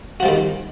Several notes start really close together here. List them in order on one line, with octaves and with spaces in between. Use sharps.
F#4 F3 G3 D#3